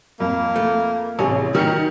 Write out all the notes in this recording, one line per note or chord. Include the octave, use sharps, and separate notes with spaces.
F2 A#3
A3
A1 C3 G#4 C#5
D#3 G3 F#4 G4 A#4 C#7